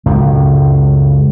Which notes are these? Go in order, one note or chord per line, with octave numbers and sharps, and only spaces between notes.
C#2 F#2 A2